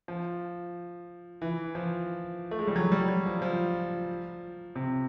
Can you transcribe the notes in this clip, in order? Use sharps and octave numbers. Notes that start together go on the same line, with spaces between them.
F3
E3
F3
A3
G#3
G3
F#3
G3
F#3
F3
F3
C3